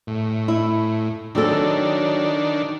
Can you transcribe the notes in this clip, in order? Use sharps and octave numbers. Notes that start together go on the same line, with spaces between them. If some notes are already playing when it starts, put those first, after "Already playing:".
A2
E4
D#3 F#3 C4 D4 A4